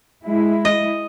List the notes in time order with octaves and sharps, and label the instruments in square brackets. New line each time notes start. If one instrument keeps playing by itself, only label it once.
[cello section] G#3 E4
[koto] D#5